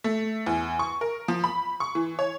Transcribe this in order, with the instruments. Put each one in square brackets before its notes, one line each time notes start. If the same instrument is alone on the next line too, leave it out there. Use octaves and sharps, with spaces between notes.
[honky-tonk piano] A3
E2
C#6
A#4
F3
B5
C#6
E3
C#5